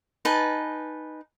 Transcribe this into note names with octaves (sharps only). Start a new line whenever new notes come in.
D#4 B4 G#5 A5